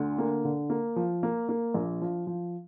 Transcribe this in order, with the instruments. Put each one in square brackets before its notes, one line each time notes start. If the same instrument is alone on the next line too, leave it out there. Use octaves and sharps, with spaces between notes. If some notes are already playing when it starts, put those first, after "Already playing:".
Already playing: [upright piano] D2 D3
A#3
D3
A#3
F3
A#3
A#3
A#1
F3
F3